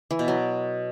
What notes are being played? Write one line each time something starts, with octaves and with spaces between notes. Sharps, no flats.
E3
B2
F#3